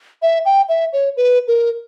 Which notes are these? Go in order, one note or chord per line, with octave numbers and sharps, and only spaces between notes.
E5
G5
E5
C#5
B4
A#4